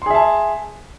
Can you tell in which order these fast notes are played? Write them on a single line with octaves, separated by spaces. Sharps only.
C6 G#4 E5 A5